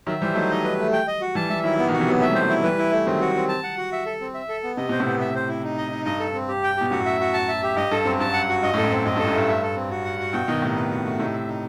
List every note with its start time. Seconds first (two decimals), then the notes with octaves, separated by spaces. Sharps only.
0.07 D#3 F#3 E5
0.21 E3 G3 C5
0.35 F#3 A3 D#4
0.50 D#5
0.65 B4
0.79 A3
0.93 G5
1.07 D#5
1.21 F#4
1.35 E3 G3 A5
1.49 E3 G3 E5
1.64 D#3 F#3 E4
1.78 B3
1.84 E3
1.88 B2 D#3
1.93 F#4
2.00 C3 E3
2.07 D#3 F#3 B3
2.21 A3 E5
2.31 G3 C5
2.41 F#3 A3
2.49 E4
2.63 E3 G3 B4
2.78 E4
2.92 A3
3.06 D#3 F#3 C4
3.21 F#4
3.36 C4
3.49 A5
3.64 F#5
3.78 F#4
3.92 E5
4.06 A4
4.21 C4
4.34 E5
4.49 A4
4.63 B3
4.77 C3 D#5
4.89 B2 C5
5.00 A2 C3
5.06 B3
5.20 E5
5.35 C5
5.49 E4
5.64 D#4
5.78 D#5
5.91 D#4
6.05 G2 D#5
6.19 A4
6.34 C4
6.48 G4
6.63 G5
6.77 B2 G4
6.91 F#2 A2 F#4
7.06 E5
7.20 F#4
7.34 A5
7.48 E5
7.63 G4
7.76 G2 D#5
7.91 G2 A4
8.05 F#2 C4
8.20 G2 A5
8.33 F#5
8.49 F#4
8.63 G2 D#5
8.74 F#2 A2
8.77 A4
8.84 F#2 A2
8.90 C4
9.05 F#2 D#5
9.16 G2
9.19 A4
9.26 F#2 A2
9.33 G2 A3
9.48 E5
9.62 A4
9.76 C4
9.90 F#4
10.05 F#5
10.19 F#4
10.33 G2 B2 G5
10.48 B2 D#3 D#5
10.62 A2 C3 D#4
10.76 B4
10.90 F#4
11.05 A3
11.19 A2 C3 D#4
11.33 E5
11.48 D#4